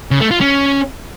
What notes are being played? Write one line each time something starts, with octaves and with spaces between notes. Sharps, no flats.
C#3
A3
F4
C#4